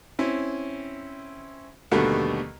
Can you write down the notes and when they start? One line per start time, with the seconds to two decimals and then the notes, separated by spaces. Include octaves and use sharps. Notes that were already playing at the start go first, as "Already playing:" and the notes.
0.19 C4 C#4 E4
1.91 D#2 B2 D3 G3 A3 B3